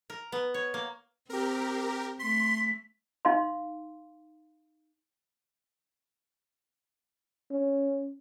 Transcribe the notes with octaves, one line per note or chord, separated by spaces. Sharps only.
A#4
B3
C#5
A#3
C4 G4 A#4
A3 C6 B6
D#4 F5 C6
C#4